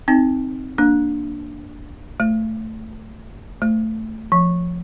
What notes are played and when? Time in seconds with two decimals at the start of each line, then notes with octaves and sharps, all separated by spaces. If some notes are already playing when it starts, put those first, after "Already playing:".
0.08 C4 D#4
0.78 A#3 D4
2.20 A3
3.62 A3
4.32 F3